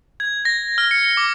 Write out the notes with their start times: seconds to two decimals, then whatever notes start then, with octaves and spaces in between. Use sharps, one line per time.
0.20 G#6
0.45 A#6
0.78 F6
0.91 C#7
1.17 D6